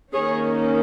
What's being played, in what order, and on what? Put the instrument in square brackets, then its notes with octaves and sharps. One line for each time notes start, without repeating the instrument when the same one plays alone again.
[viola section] D#3 A#3 C#4 G#4 C#5